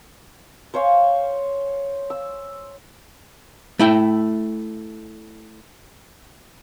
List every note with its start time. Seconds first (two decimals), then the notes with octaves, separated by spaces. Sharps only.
0.74 C5 C#5 F5 G#5
2.10 E6
3.79 A3 E4 G5